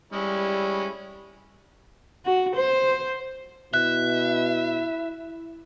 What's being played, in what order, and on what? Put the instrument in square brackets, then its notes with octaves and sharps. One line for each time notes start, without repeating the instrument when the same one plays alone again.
[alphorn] G3 [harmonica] G#3 C#4 E4
[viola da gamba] F#4
C5
[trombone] B2 [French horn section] E4 [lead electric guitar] E5 [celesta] F#6